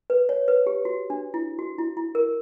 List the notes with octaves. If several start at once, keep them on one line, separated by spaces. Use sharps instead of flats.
B4
C#5
B4
G4
F#4
D4
E4
F#4
E4
E4
A#4